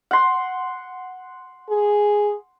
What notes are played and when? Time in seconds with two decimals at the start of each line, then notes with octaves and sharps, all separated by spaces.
0.11 F#5 C6
1.70 G#4